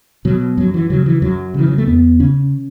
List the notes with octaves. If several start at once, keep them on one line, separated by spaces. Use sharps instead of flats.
B2 F#3
F#2 F#3
E3
C#3 F#3
E3
F#2 F#3
C#3 E3
F#3
A3
E2 B3
C#3 C#4